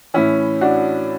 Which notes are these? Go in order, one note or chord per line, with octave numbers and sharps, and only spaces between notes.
A2 E3 C#4 E4
D4 F#4